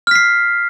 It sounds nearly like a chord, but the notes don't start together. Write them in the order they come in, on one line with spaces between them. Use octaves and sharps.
F6 B6 C7